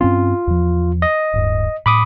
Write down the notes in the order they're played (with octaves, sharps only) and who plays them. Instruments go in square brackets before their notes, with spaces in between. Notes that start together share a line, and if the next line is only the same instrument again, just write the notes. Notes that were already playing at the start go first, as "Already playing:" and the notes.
[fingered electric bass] G2 C4 C#4 [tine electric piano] F4
[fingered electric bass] E2 F3
[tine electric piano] D#5
[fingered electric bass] D1 G2
[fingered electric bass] A2 [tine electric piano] B5 D6 D#6